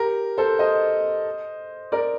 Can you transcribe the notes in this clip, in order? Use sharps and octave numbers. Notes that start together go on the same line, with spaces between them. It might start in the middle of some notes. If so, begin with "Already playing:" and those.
Already playing: G4 A#4
A4 C5
C5 D#5
A#4 D5